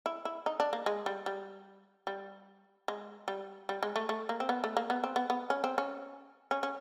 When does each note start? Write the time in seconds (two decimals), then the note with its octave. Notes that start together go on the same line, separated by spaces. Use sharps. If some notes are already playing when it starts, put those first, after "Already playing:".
0.06 E4
0.25 E4
0.46 D#4
0.60 D4
0.73 A#3
0.86 G#3
1.06 G3
1.26 G3
2.07 G3
2.88 G#3
3.28 G3
3.69 G3
3.83 G#3
3.96 A3
4.09 A3
4.29 A#3
4.40 C4
4.49 B3
4.64 A3
4.77 A#3
4.90 B3
5.04 C4
5.16 B3
5.30 B3
5.50 C#4
5.64 C4
5.78 C#4
6.51 C#4
6.63 C#4